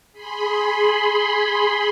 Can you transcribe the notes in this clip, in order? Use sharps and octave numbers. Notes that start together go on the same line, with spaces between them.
G#4 B5 C6